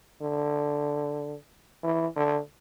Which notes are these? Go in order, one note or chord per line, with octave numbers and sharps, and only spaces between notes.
D3
E3
D3